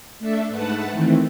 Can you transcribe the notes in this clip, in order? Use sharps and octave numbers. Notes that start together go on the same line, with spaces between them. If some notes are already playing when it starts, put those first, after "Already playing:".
A3 D4 A4 E5
G#2 A3 B4 F#5 A5
D#3 E3 A3 C4